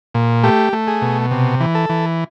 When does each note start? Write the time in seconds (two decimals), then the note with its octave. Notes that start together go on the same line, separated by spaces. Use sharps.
0.15 A#2
0.44 A3 G4
0.73 A3
0.87 G#4
1.02 B2
1.31 C3
1.60 E3
1.75 A4
1.89 E3